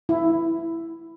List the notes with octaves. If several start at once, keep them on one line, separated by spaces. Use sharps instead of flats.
E4